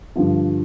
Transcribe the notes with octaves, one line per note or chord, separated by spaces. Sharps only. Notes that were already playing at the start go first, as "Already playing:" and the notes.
G2 D3 F3